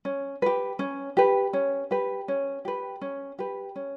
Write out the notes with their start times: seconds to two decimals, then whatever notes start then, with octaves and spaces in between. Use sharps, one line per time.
0.05 C#4
0.42 G4 B4
0.79 C#4
1.17 G4 B4
1.53 C#4
1.91 G4 B4
2.28 C#4
2.65 G4 B4
3.01 C#4
3.39 G4 B4
3.76 C#4